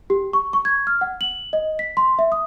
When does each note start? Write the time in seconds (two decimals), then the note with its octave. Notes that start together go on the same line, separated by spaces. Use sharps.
0.10 G4
0.33 C#6
0.53 C#6
0.65 G#6
0.87 F6
1.01 F#5
1.21 F#7
1.53 D#5
1.79 B6
1.97 C6
2.19 E5
2.32 D#6